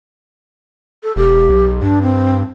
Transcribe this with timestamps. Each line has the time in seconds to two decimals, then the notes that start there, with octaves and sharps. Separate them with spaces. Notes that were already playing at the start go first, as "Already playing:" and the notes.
1.03 A4
1.16 E1 G4
1.49 B1
1.82 G2 D4
2.02 C4